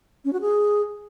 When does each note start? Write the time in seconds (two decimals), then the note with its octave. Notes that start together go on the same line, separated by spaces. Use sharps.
0.25 C#4
0.33 F#4
0.41 G#4